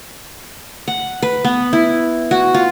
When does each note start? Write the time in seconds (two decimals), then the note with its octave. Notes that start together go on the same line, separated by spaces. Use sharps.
0.88 F#5
1.22 B4
1.44 B3
1.73 E4
2.31 F#4
2.54 F4